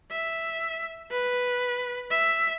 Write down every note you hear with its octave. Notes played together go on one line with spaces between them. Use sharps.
E5
B4
E5